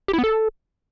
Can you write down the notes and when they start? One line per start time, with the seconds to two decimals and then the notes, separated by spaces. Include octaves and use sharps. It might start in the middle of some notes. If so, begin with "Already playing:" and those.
0.08 G4
0.13 E4
0.19 B3
0.24 A4